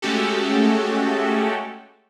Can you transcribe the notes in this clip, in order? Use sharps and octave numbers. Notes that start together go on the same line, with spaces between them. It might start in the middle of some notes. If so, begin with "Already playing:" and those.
G#3 A3 C#4 F#4 G4 A4